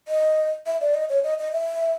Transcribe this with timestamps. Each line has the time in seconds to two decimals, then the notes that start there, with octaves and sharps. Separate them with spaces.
0.08 D#5
0.66 E5
0.81 D5
0.94 D#5
1.09 C#5
1.24 D#5
1.39 D#5
1.53 E5